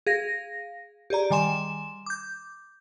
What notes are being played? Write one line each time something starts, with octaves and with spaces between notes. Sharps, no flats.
G#4 F5 A#6
G4 G#4 D5 A#5
D#3 G3 G#5 C6 E7
D6 G6